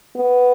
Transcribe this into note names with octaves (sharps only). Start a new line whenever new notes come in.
B3